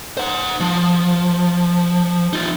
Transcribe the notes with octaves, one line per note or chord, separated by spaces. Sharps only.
C5 F#5
F3
D#4 F4